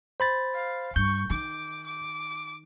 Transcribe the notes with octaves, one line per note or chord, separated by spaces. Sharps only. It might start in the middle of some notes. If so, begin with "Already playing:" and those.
C5 B5 A6
F5
G2 C#6 G6
D#3 D6
D6